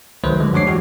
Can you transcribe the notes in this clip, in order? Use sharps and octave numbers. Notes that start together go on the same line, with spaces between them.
C#2 D#3 F#3 A3 B4 C5
D3 F3 G#3
F#2 F#3 D4 C#5 D6 C7
E3 F3 G#3 F#4 G4